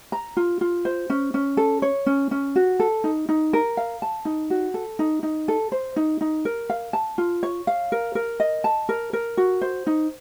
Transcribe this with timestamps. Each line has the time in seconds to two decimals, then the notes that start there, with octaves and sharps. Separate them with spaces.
0.12 A#5
0.37 F4
0.61 F4
0.85 C5
1.10 C#4
1.34 C#4
1.57 A4
1.82 C#5
2.06 C#4
2.31 C#4
2.56 F#4
2.80 A4
3.04 D#4
3.29 D#4
3.53 A#4
3.77 F5
4.02 A5
4.25 D#4
4.50 F#4
4.74 A4
4.99 D#4
5.23 D#4
5.48 A4
5.72 C5
5.96 D#4
6.21 D#4
6.45 A#4
6.70 F5
6.93 A5
7.18 F4
7.43 C#5
7.67 F5
7.92 A#4
8.15 A#4
8.40 D#5
8.64 A5
8.89 A#4
9.13 A#4
9.37 F#4
9.61 C5
9.87 D#4